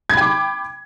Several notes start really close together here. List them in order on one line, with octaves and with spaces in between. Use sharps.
G#6 B5 G5 D6